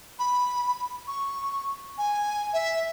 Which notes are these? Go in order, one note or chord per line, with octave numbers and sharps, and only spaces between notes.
B5
C#6
G#5
E5